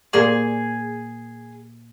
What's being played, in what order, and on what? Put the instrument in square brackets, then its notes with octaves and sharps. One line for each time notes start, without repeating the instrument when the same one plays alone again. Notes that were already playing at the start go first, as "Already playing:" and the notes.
[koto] A#2 A#3 C5 [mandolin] G#4